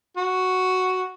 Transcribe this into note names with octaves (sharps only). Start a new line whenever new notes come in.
F#4